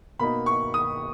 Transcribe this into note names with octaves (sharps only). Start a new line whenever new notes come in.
B2 A#3 D#4 B5
C#6
D#6